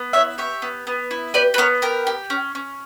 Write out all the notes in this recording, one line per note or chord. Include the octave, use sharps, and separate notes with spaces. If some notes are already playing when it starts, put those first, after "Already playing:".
Already playing: B3
E4 C#5 E5
G4 C#5 E5
B3
B3
E4
G4 B4 D5
B4
B3 A#4 C#5
G4 A#4
G4
C#4
C#4